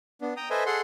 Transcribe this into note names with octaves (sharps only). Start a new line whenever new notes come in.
B3 D4
G5 A#5 D#6
A4 B4 C5 D#5 E5 G#5
G#4 A4 F#5 C6